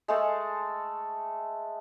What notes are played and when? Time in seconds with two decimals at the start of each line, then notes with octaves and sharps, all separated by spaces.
0.08 G#3 A3 A4